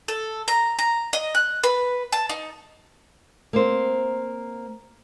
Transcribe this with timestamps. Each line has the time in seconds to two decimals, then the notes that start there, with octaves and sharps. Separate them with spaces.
0.08 A4
0.48 A#5
0.79 A#5
1.13 D#5
1.35 F#6
1.64 B4
2.12 A5
2.29 D#4
3.53 A#3 C4 C5